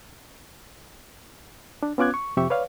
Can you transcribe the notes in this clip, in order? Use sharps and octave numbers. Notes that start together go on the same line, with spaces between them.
D4
B3 C#4 F4 D6 F#6 G#6
C#6
F2 C3 G4 E5 C#6
B4 C#5 D5 F5